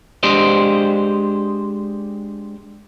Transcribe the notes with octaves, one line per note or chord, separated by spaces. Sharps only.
G#3 D4 G4 C5 D5 D#5